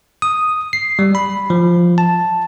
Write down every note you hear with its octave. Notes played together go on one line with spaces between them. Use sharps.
D#6
C7
G3
B5
F3
A5